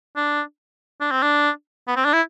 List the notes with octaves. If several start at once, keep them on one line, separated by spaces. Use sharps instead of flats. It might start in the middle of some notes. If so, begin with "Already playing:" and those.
D4
D4
C4
D4
B3
C4
D4
E4